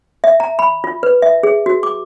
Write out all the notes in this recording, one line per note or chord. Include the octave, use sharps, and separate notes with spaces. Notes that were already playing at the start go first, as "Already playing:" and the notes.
E5
A#5
B5
F4
B4
E5
G#4
F#4
D6